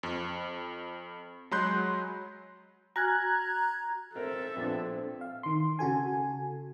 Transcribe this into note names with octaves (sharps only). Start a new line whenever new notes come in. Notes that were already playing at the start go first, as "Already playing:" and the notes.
F2
F#3 G#3 B5 C6 F#6 G6
F#4 G#5 A#5 F6 F#6 G#6
C4 A4 A#4 C5 E5
A#1 B3 C4 D4
F5
D#3 C6
C#3 F#4 A4 G#5